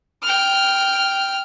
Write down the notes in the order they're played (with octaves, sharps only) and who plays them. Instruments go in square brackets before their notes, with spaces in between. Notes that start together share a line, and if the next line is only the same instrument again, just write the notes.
[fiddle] G5 F6